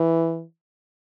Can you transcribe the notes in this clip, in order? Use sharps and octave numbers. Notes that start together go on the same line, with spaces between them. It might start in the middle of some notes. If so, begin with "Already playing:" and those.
Already playing: E3